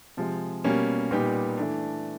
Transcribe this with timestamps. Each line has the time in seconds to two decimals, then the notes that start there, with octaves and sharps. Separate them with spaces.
0.17 C3 F3 G#3
0.64 B2 G3 A#3 C#4
1.11 A#2 G3 B3 D#4 G4
1.57 E3 A3 D4